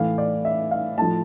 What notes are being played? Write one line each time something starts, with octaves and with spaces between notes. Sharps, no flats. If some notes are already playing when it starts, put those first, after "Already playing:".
Already playing: A2 E3 F5
D5
E5
F5
A2 F3 A5